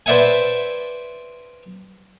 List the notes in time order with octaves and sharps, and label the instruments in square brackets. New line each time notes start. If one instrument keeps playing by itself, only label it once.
[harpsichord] B4 C5 D5 E5 F#5 G#5